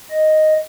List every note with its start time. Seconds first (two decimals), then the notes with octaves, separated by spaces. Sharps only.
0.10 D#5